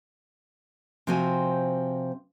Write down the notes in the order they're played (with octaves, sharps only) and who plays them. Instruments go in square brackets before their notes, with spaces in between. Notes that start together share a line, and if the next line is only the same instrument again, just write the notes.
[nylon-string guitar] C3 F3 C4 F#4 G#5